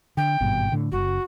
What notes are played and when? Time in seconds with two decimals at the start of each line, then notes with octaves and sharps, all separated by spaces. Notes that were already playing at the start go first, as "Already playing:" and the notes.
0.17 D3 G5
0.40 G#1 G2 B2
0.72 A2 D3
0.92 F#1 F#4